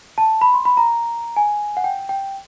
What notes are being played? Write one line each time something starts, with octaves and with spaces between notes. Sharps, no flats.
A5
B5
C6
B5
A#5
G#5
F#5
G5
G5